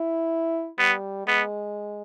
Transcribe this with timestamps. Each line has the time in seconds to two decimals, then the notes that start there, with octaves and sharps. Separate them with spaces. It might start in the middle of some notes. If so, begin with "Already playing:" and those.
Already playing: E4
0.79 G3 B3
1.27 G#3 B3